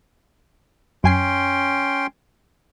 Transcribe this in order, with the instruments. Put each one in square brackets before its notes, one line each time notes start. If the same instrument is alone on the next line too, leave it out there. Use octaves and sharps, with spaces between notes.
[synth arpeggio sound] F#2 G#5 C7 [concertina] C#4 G5 C6